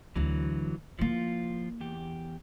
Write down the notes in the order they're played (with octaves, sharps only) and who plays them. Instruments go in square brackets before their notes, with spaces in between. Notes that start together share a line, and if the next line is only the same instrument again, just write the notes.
[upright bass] D2 D4 [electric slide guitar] E3 F#3
[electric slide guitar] F3 F4 [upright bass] A#3 E4
[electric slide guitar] E2 G4